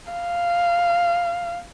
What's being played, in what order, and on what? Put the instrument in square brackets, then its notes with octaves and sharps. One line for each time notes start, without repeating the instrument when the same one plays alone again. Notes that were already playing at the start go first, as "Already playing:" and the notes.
[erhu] F5